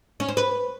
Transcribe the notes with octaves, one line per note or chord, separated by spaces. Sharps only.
C#4
C5
B4